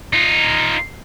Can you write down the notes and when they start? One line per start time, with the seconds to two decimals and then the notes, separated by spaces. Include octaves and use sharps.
0.13 D#4 F4